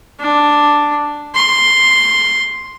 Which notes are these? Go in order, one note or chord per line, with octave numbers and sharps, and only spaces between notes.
D4
C6